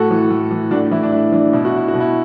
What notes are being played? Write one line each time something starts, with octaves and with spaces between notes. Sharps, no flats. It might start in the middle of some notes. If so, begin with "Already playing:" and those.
Already playing: A2 F#4 A4
E3
A2
E3
A2 D4 F#4
E3 E4
D4
A2 E4
E3 D4
B2 E4
F#4
E4
F#4
B2
E4